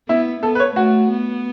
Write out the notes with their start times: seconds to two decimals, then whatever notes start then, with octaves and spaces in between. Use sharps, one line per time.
0.09 B3 E4
0.43 B3 A4
0.55 B4
0.60 C#5
0.76 A3 F#4
1.11 B3